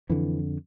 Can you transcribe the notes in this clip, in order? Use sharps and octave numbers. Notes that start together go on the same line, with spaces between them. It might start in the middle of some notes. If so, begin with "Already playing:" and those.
F2 D3 E3